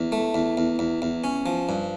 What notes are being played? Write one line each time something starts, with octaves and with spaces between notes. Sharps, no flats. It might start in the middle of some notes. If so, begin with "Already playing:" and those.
Already playing: E2
A3
E2
E2
E2
E2
C#4
F3
G2